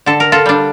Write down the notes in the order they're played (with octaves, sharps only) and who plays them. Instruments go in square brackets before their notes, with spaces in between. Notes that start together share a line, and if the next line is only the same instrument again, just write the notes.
[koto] D3 A4
A#4
F4 A4
G3 D4